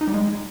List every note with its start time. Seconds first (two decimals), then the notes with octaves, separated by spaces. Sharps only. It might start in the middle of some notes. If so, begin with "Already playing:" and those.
0.01 D#4
0.07 G3
0.14 G#3